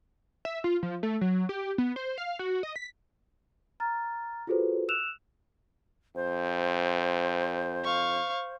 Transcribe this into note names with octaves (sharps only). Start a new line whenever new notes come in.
E5
F4
F3
A3
F#3
G4
B3
C5
F5
F#4
D#5
B6
A#5 F6 A6
F4 F#4 G#4 A4 B4 C5
E6 F#6 E7 F7
F2 C5
F5 C#6